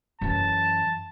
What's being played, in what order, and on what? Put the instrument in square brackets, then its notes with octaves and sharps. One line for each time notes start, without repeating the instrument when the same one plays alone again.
[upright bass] F#2 E3 [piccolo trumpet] A5